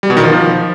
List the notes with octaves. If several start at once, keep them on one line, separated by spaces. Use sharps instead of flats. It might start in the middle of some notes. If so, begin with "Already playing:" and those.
G3
B2
D#3
F3